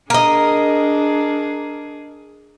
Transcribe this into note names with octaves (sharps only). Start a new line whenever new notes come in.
D4 G#4 A#4 D#5